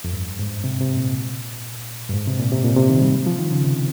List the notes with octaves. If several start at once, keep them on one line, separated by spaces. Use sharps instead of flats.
F2
G2
G#2
C3
C3
A#2
G2
G#2
C3
A#2
C3
A#2
C3
D#3
G3
F3
D#3
C#3
C3